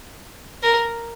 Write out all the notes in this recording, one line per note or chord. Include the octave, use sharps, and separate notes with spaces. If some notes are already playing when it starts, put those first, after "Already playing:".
A#4